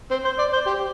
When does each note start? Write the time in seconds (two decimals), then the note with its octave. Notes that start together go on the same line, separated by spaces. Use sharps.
0.11 C4
0.25 C5
0.39 D5
0.53 C5
0.67 G4